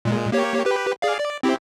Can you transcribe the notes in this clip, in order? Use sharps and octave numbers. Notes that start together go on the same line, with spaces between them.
A#2 G#3
A#3 G4 C#5
G4 B4
G#4 D5 F5
D5
C4 E4 G4